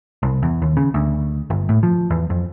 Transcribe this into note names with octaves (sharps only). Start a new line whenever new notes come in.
C2
E2
D#2
C#3
D2
G1
A2
F3
E2
F2